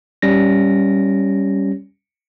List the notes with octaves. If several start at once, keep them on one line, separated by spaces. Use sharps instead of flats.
G3 C#4 A#6